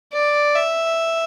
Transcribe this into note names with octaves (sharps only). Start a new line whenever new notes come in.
D5
E5